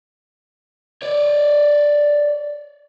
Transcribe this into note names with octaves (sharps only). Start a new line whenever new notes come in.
C#5 D5